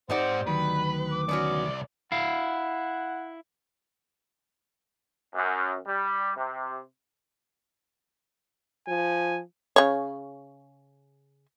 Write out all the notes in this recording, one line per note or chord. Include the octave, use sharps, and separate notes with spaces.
G#2 C4 D#4 G4 C5 D5 F#5
D2 D#3 F#3 B4 B5
D6
C2 B3 C#4 F#4 D5
E4 F5 F#5
F#2
G3
C3
F3 G#5
C#3 C#5